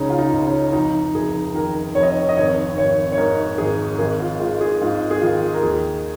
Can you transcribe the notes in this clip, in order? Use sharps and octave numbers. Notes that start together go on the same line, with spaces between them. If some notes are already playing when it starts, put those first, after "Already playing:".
Already playing: C#2 C#3 G#3 C#4 D#4
F4
D#4
C#2
C#4
F1 D#4
F1 G#4
D#3 A#4
F1 C#5
D#5
C#5
D#5
G#1 C#5
G#1 C#5
C#5
G#2 A#4
G#1 G#4
A#4
G#1 G#4
F4
G#3 F4
G#4
G#2 F4
G#4
D#3 F4
A#4
D#2 G#4